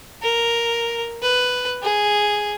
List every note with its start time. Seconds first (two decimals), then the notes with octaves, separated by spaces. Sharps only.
0.22 A#4
1.22 B4
1.83 G#4